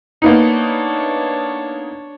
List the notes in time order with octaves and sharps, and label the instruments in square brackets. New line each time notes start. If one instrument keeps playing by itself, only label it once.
[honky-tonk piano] A#3 B3 D#4 [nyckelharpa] D4 C#5